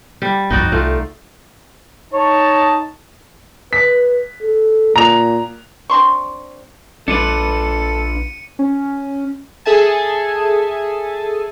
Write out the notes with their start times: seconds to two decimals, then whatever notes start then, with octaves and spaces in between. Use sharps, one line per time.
0.22 G3
0.50 G1 C2 F2 D#4 F#4 D5
0.72 C2 A3 F4
2.13 D#4 C#5 D#5 A5
3.73 B4 B6
4.43 A4
4.96 A#2 A#5 F7
5.90 C4 D4 C6 C#6
7.08 A#1 D4 F4 A4 B4 C#7 D#7
8.59 C#4
9.66 G#4 A4 E5 G#5 A5